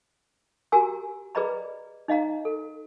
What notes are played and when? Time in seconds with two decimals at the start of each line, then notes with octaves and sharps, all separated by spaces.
0.72 F#4 G4 A#4 G#5 A#5 E6
1.35 G#4 B4 D5 D#5 A#5 B5
2.08 D#4 D#5 F5 A#5
2.45 A4